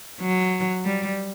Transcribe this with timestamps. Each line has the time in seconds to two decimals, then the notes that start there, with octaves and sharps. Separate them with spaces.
0.21 F#3
0.85 G3